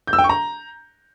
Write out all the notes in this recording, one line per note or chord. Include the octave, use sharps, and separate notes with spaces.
G6
E6
G5
C#6
A#5